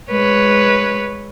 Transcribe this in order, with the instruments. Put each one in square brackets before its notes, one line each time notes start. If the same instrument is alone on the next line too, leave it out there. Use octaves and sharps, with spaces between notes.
[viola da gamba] G#3 B4 C#5